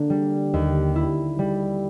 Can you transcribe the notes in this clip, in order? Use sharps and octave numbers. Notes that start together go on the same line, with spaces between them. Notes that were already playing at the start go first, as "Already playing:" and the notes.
Already playing: D3 A#3
G3
D#2
E4
G3